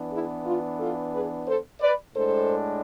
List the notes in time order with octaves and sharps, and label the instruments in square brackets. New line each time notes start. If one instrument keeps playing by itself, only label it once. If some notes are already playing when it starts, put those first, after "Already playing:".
Already playing: [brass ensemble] E3 B3 D4
E4 G#4
F4
F4 A4
G#4 B4
A4 C5
B4 D5
A2 G#3 D4 A4 C5